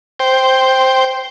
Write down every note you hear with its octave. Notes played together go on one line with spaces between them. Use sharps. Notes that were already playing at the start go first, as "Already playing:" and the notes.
C5 G5